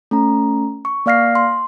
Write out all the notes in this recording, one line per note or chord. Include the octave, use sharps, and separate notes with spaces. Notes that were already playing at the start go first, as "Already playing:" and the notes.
A3 C#4 A#5
C#6
A#3 D5 F5 F6 A#6 C7
C6